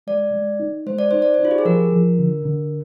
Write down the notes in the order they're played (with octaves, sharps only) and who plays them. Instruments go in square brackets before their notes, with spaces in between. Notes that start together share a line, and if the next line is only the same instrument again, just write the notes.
[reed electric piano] G#3 [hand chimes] D5
[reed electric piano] G#3
D#4
[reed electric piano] G#3 [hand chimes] C5
[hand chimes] D5
[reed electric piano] D#4 [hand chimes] C5
[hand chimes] D5
C5
[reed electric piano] D#4 [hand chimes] F4
[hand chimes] G4
G#4
[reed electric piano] F3 [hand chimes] A#4
[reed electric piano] F3
D3
D3